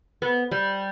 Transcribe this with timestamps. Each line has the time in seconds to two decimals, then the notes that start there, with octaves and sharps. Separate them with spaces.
0.22 B3
0.51 G3